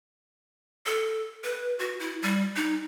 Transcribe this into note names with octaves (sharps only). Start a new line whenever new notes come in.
A4
B4
F#4
E4
G3
D#4